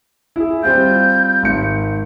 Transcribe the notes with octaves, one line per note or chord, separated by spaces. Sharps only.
E4 G#4
G3 C4 F4 G6
G#1 C#7